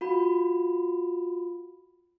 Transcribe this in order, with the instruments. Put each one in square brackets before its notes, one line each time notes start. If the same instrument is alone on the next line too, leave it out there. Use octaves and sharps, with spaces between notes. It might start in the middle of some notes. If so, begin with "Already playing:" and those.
[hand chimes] F4 F#4 B5